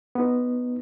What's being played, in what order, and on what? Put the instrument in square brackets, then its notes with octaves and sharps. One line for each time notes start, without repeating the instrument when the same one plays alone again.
[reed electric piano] B3 D#4